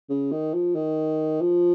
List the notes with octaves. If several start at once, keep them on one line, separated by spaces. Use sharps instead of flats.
C#3
D#3
F3
D#3
F3